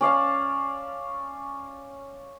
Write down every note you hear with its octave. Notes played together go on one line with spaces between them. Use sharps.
C#4 D5 F5 A5